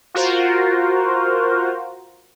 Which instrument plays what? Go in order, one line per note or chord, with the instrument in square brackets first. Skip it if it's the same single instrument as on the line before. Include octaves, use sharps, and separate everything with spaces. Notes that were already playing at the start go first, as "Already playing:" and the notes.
[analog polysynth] F4 F#4 A#4 C5